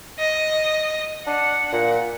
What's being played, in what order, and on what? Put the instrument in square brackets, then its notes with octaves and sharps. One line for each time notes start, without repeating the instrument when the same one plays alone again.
[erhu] D#5
[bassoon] D4 [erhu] F#5
[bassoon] A#2